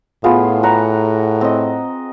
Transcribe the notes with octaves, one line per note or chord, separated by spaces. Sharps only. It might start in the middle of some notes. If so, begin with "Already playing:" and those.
A2 B3 F4 G#4
F#5 A#5
C4 D#5